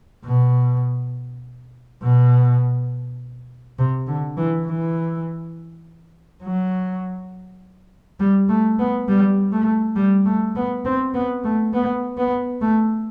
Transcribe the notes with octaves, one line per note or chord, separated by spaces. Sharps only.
B2
B2
C3
D3
E3
E3
F#3
G3
A3
B3
G3
A3
G3
A3
B3
C4
B3
A3
B3
B3
A3